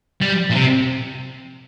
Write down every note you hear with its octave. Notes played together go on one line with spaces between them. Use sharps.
G3
A#2
C3